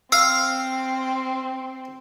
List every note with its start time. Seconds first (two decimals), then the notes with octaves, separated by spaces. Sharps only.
0.12 C4 F5 E6